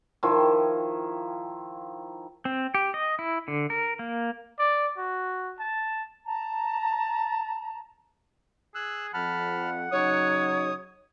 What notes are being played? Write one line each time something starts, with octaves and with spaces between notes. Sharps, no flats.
D#3 F3 E4 C6
C4
G4
D#5
E4
D3
A#4
A#3
D5
F#4
A5
A5 A#5
G#4 E6 F#6
F2 F#5 A5 B5 F6
C#3 F#3 D#4 C#5 D#6